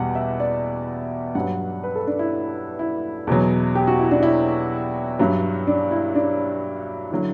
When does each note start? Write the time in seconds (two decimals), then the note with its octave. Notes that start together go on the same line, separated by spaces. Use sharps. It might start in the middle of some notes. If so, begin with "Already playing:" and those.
Already playing: E2 B2 G3 F#5
0.15 E5
0.40 D5
1.35 G2 F#3 F#5
1.83 B4
1.95 A4
2.07 D4
2.19 E4
2.79 E4
3.27 E2 B2 F#3
3.75 G4
3.87 F#4
3.99 E4
4.11 D4
4.23 E4
5.19 G2 F#3
5.67 D4
5.91 E4
6.15 D4
7.11 D3 F#3 E4